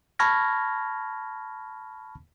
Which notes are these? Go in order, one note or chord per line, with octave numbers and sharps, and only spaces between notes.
A5 B5 C#6 F6 G#6 A#6